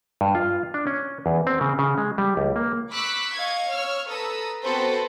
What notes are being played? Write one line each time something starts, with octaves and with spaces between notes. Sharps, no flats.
G2
F4
D4
C#4
E2
C4
C#3
C#3
G#3
G3
C#2
A#3
B5 C#6 D6 E6 F#6 B6
D#5 F5 C#6 G#6
C#5 E6 F6
A4 B4 A#5 D#6 E6
B3 C4 F#4 A4 B4 C5